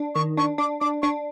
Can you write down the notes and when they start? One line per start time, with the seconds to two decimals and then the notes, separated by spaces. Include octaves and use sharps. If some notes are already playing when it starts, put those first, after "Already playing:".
Already playing: D4
0.15 D#3 C#6
0.37 D4 C#6
0.58 D4 D6
0.81 D4 D6
1.02 D4 C#6